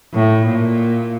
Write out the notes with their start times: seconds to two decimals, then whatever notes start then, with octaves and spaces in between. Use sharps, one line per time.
0.14 A2
0.47 A#2